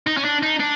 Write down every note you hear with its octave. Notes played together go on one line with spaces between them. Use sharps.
D#4
C#4
D4
D#4
D4